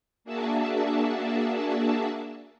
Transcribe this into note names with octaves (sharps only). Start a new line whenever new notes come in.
A#3 D4 F#4 G#4 E5 A5